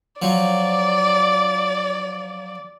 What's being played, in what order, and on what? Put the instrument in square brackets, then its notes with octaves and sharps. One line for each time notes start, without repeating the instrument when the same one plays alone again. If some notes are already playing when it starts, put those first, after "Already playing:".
[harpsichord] F3 F#3 [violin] D5